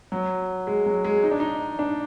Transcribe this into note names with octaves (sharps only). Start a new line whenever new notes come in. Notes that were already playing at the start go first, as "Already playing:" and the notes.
F#3
G#3
F#3
G#3
D#4
D4
D#4
D4